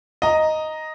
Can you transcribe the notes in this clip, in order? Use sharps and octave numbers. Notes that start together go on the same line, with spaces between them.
D#5 A#5